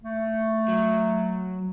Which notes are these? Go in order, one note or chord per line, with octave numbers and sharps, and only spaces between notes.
A3
F#3